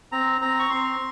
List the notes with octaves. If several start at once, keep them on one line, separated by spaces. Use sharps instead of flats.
C4 A#5
C4 A#5
C#6
C4 C6